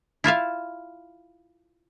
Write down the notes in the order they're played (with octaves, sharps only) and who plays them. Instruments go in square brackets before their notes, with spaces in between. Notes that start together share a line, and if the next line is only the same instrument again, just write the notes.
[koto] E4 F4 E5 F5